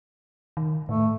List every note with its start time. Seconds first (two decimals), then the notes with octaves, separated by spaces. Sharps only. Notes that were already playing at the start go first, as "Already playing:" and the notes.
0.57 D#3
0.89 A2 A3